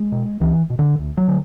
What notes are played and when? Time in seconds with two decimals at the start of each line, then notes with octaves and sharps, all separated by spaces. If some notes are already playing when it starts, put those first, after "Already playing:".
Already playing: G#3
0.12 B2
0.40 C#2 E3
0.70 B2
0.79 D3
0.99 D2
1.17 F#3
1.28 D3